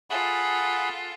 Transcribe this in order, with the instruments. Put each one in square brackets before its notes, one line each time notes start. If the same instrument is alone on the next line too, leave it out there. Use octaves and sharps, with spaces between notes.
[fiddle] F4 A4 [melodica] G#4 F#5 B5